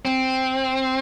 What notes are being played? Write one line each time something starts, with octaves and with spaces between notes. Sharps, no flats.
C4